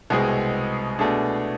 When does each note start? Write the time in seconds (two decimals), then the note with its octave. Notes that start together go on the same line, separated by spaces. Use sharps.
0.10 C2 B2 G#3 C4 G#4
0.99 B2 A3 D4 G#4